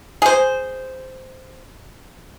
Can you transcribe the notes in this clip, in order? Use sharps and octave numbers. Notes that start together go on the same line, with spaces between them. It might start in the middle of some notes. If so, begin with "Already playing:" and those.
G#4 C5